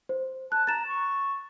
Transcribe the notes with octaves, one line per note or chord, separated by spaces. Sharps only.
C5
A5 F#6
A#5 A6 E7
C#6